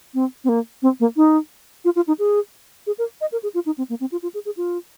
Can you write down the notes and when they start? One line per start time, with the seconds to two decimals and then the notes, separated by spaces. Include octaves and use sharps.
0.14 C4
0.44 C4
0.49 A#3
0.82 C4
1.00 A#3
1.17 D#4
1.85 F4
1.96 F4
2.07 D#4
2.19 G#4
2.87 G#4
2.98 A#4
3.21 D#5
3.32 A#4
3.43 G#4
3.54 F4
3.66 D#4
3.78 C4
3.89 A#3
4.00 C4
4.12 F4
4.23 F4
4.34 G#4
4.45 G#4
4.57 F4